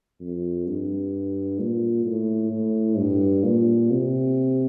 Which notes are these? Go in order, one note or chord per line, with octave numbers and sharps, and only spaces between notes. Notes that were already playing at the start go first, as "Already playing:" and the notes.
F2
G2
A#2
A2
A2
G2
A#2
C3